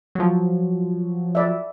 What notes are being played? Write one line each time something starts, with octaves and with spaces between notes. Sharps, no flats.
F3 F#3
D5 E5